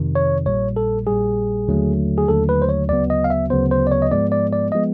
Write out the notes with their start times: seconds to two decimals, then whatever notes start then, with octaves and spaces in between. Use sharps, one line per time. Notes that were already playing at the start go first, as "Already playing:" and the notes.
Already playing: F2 C3 D#3
0.15 C#5
0.46 A#1 A#2 G3 C#5
0.76 A4
1.07 A#1 A#2 G3 G#4
1.68 D#2 D3 F#3 A3
2.18 G#4
2.28 D#2 D3 F#3 A3 A4
2.49 B4
2.62 C5
2.69 C#5
2.89 D2 C#3 F#3 B3 D5
3.10 D#5
3.24 F5
3.30 E5
3.50 D2 C#3 F#3 B3 C5
3.71 C5
3.87 D5
3.91 C#5
4.02 D#5
4.11 G#2 F3 G#3 B3 D5
4.32 D5
4.53 D5
4.72 F3 G#3 B3 D#5